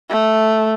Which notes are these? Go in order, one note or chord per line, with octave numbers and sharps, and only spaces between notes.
A3